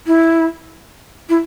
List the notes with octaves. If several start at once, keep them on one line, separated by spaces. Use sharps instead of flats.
E4
E4